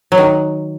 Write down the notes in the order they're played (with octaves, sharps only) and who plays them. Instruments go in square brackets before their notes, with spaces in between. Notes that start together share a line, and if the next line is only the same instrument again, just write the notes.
[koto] F#3
D#3